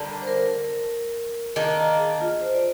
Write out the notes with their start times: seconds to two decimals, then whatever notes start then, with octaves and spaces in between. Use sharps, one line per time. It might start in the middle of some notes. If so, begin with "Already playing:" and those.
Already playing: D3 G3 A#3
0.22 C5
0.27 A#4
1.56 D#3 A#3 D4 G#4
1.78 G#4
1.99 G#4
2.21 F4
2.41 C5
2.54 D5